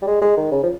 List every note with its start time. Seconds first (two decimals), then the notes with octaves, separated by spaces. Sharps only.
0.02 G3
0.07 G#3
0.22 G#3
0.37 D#3
0.51 C#3
0.63 F3